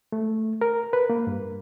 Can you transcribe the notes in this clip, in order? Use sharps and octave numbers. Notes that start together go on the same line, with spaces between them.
A3
A#4
B4
A#3
G2